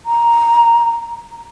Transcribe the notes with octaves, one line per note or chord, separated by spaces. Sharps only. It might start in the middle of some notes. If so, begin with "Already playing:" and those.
A#5